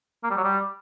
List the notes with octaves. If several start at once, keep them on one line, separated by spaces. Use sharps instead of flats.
A#3
G3
F#3
G3